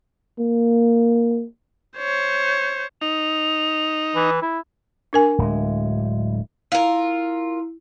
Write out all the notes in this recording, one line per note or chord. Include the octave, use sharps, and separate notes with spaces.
A#3
C5 C#5
D#4 F7
E3
E4
D4 A#4 G#5
D1 G#3
E4 F4 A#4